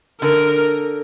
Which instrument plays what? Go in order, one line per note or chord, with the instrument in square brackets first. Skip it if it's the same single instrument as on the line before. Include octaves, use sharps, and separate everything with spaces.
[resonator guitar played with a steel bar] D3 [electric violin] A#4